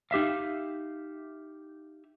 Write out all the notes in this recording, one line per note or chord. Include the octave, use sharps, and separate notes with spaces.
D#4 G4 E5 F5